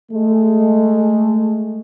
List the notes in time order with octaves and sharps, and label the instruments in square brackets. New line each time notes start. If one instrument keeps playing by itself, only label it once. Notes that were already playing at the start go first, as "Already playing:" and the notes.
[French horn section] G#3 A3